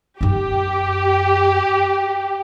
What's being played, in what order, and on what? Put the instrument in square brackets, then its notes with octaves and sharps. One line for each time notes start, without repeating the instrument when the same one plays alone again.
[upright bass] F#2 D#4 [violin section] G4